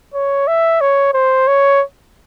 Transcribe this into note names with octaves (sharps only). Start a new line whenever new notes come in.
C#5
E5
C#5
C5
C#5